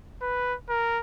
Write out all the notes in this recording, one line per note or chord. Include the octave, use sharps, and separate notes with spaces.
B4
A#4